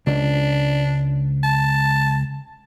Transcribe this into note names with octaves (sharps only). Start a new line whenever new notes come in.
C#2 D4
A5